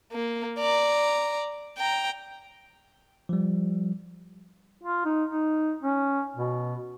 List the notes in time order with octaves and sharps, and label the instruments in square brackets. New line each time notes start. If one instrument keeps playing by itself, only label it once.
[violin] A#3
D5 A#5
G5 A#5
[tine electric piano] F3 G3
[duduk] F4
D#4
D#4
C#4
B2